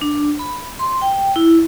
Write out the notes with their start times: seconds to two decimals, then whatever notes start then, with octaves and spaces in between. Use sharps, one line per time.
0.01 D4
0.39 B5
0.79 C6
1.01 G5
1.36 E4